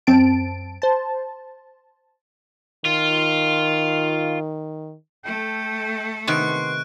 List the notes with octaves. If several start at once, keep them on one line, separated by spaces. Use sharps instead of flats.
F#2 C4 A5 D7
C5 A5
D#3 F4
A3 A4 G5
C3 D#3 B3 C6 C#6 F#6 D7